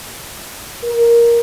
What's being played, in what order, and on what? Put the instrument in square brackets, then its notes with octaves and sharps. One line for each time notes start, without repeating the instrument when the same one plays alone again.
[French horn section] A#4